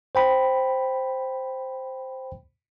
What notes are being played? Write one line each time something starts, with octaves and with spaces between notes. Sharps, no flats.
C5 G5 B5